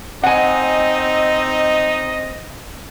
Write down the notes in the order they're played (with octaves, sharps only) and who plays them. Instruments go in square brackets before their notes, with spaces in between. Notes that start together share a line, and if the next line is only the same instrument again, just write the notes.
[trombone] C4 [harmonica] D#4 [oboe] D#5 [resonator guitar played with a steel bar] F#5 G#5